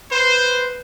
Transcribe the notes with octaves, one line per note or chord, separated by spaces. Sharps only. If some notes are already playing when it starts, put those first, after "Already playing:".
B4 C5